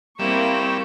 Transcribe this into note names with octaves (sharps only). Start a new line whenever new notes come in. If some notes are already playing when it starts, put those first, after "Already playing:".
G3 A#3 C4 E4 C#6 E7